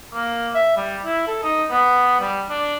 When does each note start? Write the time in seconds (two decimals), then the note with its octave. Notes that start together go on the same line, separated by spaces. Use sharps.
0.14 A#3
0.55 E5
0.77 G3
1.05 E4
1.27 A4
1.43 D#4
1.70 B3
2.20 G3
2.49 D4